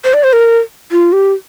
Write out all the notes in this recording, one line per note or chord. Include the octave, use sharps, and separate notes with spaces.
C5
D5
C5
A#4
F4
G4